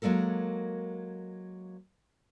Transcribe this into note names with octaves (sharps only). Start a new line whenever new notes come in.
F#3 G#3 A#3 A4 A#4